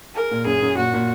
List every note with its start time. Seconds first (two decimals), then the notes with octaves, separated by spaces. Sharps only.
0.16 G#4 A#4
0.31 A#2
0.46 F#2 G#4
0.62 F#2
0.77 A#2 F#4
0.93 A#2